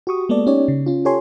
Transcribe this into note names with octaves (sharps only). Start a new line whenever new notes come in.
F#4 G4 C#6 D#6
G#3 A#3 B3 A4 D5
C#4 D#4 G4 C#5 D5
C#3
C#4 F4
F4 G4 A4 C#5 G#5 C6